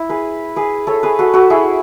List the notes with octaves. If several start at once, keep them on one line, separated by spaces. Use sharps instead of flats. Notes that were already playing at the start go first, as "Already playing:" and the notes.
Already playing: E4
G#4 B4
G#4 B4
A4 C#5
G#4 B4
F#4 A4
F#4 A4
E4 G#4